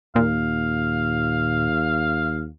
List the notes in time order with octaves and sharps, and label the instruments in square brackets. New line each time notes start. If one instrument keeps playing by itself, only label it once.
[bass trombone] D#2 [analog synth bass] A#2 [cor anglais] F5